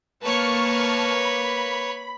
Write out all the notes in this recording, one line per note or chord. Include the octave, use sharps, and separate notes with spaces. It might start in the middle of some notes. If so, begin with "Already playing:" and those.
A#3 B4 C#5 A5 C#6 F6
B5